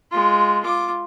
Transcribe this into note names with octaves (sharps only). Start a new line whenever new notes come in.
G#3 F4
F4 D6